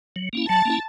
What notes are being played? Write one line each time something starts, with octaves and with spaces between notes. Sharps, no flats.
F#3
A#3 C#4 E4
F#3 A5
A#3 C#4 E4